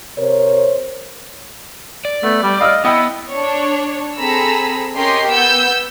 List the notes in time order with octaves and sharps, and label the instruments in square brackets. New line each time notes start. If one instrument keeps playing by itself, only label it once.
[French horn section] C3 A#4 C5 C#5
[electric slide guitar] D5
[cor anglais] A3 [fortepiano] B3
[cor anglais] G3
[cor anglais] D#5 [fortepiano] F5 E6 F6
[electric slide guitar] B3 [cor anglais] E4 [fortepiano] D#5 G5 E6
[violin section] D4 C#5
C4 G#4 A4 A#5 B5 E6
C#4 G4 A#4 D#5 C6
B3 F#5 E6 G6